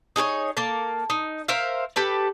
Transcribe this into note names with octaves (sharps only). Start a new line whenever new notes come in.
D#4 G#4 A#4 C#5
A#3 A4
D#4
A#4 C5 E5 F5
G4 A4 B4